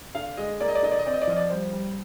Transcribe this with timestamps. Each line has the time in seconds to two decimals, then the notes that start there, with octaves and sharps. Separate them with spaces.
0.15 D3 F5
0.37 G#3 D#5
0.60 A#3 D5
0.68 D#5
0.75 D5
0.83 D3 D#5
0.91 D5
0.99 D#5
1.06 C4 D5
1.14 D#5
1.22 D5
1.27 F3 D#5
1.36 D5
1.50 G3 C5
1.73 G3